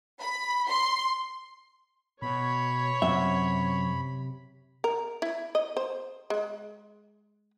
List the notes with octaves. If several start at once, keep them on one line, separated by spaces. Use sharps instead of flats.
B5
C6
B2 C#5 B5
F#2 C3 E5
A#4
E4
D#5
C5
G#3